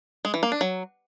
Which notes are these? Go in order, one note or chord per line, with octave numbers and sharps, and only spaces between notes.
G#3
E3
A#3
D4
F#3